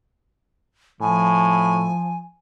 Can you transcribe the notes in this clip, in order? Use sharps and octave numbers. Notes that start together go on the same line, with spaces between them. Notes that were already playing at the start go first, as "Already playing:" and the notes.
A2 F3 G#5